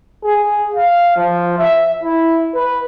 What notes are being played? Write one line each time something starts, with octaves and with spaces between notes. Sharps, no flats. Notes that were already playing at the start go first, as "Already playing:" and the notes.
G#4
F5
F3
E5
E4
B4